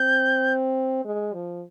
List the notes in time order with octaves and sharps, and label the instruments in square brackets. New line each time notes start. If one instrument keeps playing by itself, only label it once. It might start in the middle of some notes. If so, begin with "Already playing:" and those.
Already playing: [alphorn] C4 [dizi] G6
[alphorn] G#3
F3